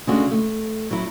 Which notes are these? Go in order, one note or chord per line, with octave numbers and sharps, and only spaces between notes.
C#3 G#3 A3 C#4 D4 F#4
A3
F#3 E4